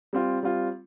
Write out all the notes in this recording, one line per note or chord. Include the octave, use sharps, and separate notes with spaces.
G3 C4 F4
G3 C4 F4